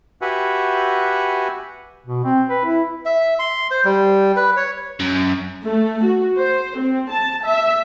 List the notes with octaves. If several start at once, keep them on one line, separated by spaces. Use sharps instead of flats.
F#4 G4 B4 E5 F#5 G#5
B2
C4
B4
E4
E5
C6
C5
G3
B4
C#5
F#2
A3
F#4
C5
C4
A5
E5